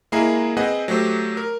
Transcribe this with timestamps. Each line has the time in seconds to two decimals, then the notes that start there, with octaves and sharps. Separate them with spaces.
0.12 G#3 A#3 E4 G#4 A#5 C7
0.57 C4 G#4 B4 C5 D#5 F#5
0.88 F#3 A3 G4 C5
1.37 A#4